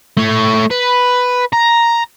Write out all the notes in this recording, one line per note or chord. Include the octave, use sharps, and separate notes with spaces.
A3 C#5
B4
A#5